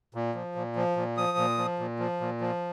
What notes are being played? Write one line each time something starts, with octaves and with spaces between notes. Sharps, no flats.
A#2
F3
A#2
F3
A#2
F3 D#6
A#2
F3
A#2
F3
A#2
F3